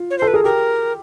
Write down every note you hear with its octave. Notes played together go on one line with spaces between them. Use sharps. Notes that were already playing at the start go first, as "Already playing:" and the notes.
Already playing: F4
C#5
C5
A4
B4
G#4 A#4
G4 A#4